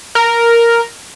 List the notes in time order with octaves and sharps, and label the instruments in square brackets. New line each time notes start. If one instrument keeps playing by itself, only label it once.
[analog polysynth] A#4